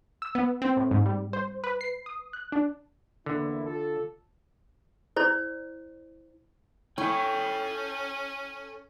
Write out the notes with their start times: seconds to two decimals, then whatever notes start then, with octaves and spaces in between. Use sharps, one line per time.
0.22 E6
0.35 B3
0.62 C4
0.77 A2
0.91 G#2
1.06 G3
1.33 C5
1.64 B4
1.81 C7
2.06 D#6
2.33 F#6
2.52 D4
3.26 E2 D3 A#3 E4
3.65 F4 A4
5.16 E4 C5 D5
6.98 C#4 E4 A4 C#5 G5 G#5